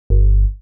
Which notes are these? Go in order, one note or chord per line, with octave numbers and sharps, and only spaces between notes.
G1